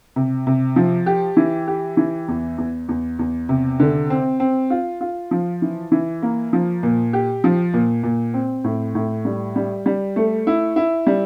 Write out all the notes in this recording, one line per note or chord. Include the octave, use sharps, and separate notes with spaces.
C3
C3
F3
G4
E3
G4
E3
E2
E2
E2
E2
C3
D3
C4
C4
F4
F4
F3
E3
E3
A#3
F3
A#2
G4
F3
A#2
A#2
C4
A2
A2
G3
G3
G3
A3
E4
E4
G3